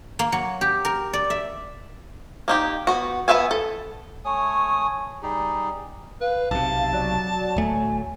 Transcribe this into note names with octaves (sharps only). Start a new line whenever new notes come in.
A#3
F#3
G4
A#4
D5
E5
A#3 D#4 G4
B3 F#4
B3 B4 E5 F5 G#5
A4
A3 C#5 G#5 D#6
G3 D#4 G4 G#4
B4 F5
B1 C3 A5
F#3 D5
D1 A3 G#5